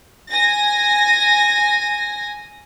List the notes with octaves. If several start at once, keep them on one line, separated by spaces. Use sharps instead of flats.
G#5 A#6